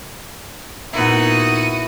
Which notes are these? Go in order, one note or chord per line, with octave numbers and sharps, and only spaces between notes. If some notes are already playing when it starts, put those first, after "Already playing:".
A#2 B3 D#4 E4 F#4 A#4 D#7